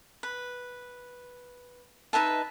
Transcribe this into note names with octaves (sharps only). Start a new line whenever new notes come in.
B4
D#4 B4 E5 A5